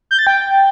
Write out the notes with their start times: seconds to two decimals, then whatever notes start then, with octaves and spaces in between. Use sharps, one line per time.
0.11 G6
0.19 A6
0.27 G5